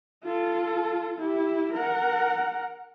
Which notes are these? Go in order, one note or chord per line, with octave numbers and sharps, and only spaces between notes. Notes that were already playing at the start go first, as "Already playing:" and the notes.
F4 A4
E4 G4
A#4 F#5